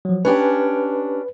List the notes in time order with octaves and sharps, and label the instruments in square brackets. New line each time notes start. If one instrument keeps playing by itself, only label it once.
[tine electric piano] F3 F#3
[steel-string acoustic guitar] C#4 D4 G4 [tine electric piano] B4